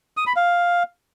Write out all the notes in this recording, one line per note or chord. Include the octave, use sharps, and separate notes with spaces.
D#6
B5
F5